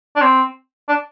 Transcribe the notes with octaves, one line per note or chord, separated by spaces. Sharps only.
D4
C4
D4